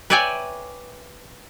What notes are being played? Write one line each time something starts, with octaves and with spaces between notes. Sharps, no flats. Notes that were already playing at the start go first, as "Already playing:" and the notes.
B4 C#5 D5 E5 G5 G#5